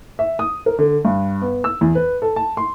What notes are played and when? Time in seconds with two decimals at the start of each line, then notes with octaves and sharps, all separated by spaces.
0.19 E5
0.39 D#6
0.66 A#4
0.79 D3
1.05 G2
1.42 B3
1.64 E6
1.81 E2
1.95 B4
2.22 A4
2.36 A5
2.57 C6